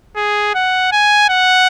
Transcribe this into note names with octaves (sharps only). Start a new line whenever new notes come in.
G#4
F#5
G#5
F#5